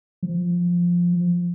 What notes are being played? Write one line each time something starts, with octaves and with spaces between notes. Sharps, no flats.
F3